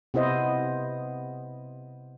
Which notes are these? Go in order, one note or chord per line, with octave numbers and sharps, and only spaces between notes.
C3 B3 E4 C5 D#5